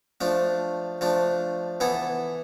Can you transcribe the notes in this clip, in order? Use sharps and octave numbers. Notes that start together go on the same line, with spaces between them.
F3 A3 D4
F3 A3 D4
E3 B3 E4 A4